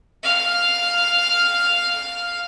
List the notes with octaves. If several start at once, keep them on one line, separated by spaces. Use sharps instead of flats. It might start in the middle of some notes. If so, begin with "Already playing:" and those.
F5 F6